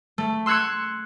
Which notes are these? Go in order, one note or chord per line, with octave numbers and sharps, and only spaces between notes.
A3
C6 E6 F#6 G#6 C#7